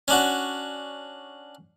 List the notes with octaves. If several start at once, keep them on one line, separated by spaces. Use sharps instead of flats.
C#4 D4 F#4